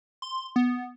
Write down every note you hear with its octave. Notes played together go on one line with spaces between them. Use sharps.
C6
B3